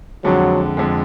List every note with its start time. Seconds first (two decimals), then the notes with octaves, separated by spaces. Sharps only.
0.24 F2 D3 F#3 G#3
0.77 F2 D3 G#3